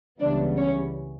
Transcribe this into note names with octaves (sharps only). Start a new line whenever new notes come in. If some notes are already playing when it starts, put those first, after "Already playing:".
C#2 C#3 E3 G3 B3 D4 D5
C#4 C#5